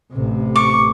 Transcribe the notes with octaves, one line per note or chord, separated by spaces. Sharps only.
A1 C3
C#6 D6